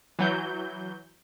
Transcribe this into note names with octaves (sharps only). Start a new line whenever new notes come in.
E3 F#3 G6